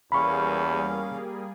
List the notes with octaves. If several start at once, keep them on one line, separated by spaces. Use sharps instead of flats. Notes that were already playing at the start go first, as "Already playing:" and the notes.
E2 G3 A#3 C#4 G#4 F5 B5 C#6